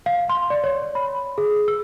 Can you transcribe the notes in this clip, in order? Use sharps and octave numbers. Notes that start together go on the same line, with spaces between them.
F5
C6
D5
C#5
B5
G#4
E6